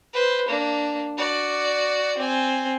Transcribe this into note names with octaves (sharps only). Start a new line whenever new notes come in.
B4 C5
A#3 D4
F#4 D5
C4 G#5